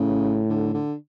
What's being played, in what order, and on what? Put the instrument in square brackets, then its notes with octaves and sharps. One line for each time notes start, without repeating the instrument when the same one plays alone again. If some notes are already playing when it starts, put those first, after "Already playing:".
Already playing: [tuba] A2 [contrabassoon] C#3
[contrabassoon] D3
D3